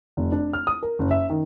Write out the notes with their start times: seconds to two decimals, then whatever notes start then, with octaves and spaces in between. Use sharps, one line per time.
0.17 F1
0.32 D4
0.53 F6
0.67 D#6
0.83 A#4
0.99 F#1
1.11 E5
1.30 D#3